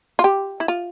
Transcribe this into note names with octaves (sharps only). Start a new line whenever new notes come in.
F4
G4
E4
F4